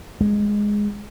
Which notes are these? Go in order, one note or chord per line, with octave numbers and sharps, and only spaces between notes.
G#3